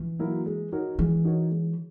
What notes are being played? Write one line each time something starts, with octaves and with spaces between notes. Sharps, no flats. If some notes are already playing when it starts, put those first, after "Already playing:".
Already playing: E3
F#3 A#3 E4 A#4
G#3
D#4 F#4 A#4 C#5
E3 G#3
D#4 F#4 A#4 C#5
G#3